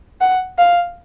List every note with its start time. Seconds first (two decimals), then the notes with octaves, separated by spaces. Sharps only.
0.21 F#5
0.58 F5